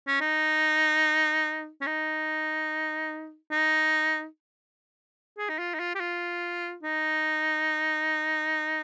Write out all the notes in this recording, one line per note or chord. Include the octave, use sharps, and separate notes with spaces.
C#4
D#4
C#4
D#4
D#4
G#4
D#4
F4
D#4
F4
G4
F4
D#4